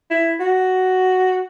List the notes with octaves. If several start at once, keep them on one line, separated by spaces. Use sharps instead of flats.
E4
F#4